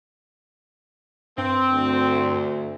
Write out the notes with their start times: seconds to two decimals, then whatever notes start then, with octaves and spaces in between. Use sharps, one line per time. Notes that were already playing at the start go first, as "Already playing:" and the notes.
1.38 G2 C4
1.71 D2